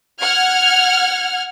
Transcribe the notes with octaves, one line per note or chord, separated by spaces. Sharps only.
F#5 F6 G#6